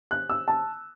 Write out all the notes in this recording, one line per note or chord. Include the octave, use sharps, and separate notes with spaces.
F#6
E6
A5